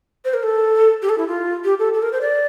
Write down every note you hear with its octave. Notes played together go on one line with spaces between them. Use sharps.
C5
A#4
A4
G4
A4
E4
F4
G4
A4
A4
A#4
C5
D5